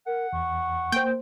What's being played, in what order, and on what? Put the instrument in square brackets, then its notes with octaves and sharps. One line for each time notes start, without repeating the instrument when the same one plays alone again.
[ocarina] A#4 [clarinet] F#5
[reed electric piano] E2 [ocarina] C#6
[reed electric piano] A#3 C5 [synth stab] G5